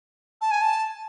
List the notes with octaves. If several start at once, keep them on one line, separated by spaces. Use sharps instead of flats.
A5
G#5
A5